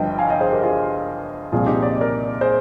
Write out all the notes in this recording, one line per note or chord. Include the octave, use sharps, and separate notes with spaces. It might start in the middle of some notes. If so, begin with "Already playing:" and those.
Already playing: G1 G2 F3 D#5 G5
F5 G#5
D#5 G5
G#4 C5
G4 A#4
F4 G#4
C2 A#2 F3 F4 G#4
D#4 G4
D5
D#5
A#4 D5
G#4 C5